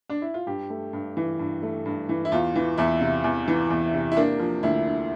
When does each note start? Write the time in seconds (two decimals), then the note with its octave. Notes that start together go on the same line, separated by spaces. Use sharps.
0.10 D4
0.22 E4
0.34 F4
0.46 G2 G4
0.70 A3
0.93 G2
1.17 E3
1.39 G2
1.62 A3
1.86 G2
2.09 E3
2.25 E4
2.32 E2 F4
2.56 E3
2.77 E2 E4
3.01 C3
3.24 E2
3.48 E3
3.70 E2
3.94 C3
4.12 E4
4.17 A#3 D4
4.39 F3
4.63 D2 E4
4.85 D3